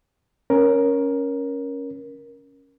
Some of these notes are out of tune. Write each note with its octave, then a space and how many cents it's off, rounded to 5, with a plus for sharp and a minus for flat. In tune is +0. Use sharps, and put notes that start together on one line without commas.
C#4 +0 A#4 +10